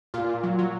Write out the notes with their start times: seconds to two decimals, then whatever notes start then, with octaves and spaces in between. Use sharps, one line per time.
0.14 A#2 F4
0.29 A#2
0.43 F#3
0.59 F#3